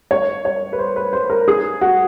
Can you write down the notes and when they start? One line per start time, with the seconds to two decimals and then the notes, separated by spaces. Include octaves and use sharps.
0.11 C#5
0.45 C#5
0.73 B4
0.79 C5
0.96 B4
1.13 C5
1.30 A#4
1.48 G#4
1.81 F#4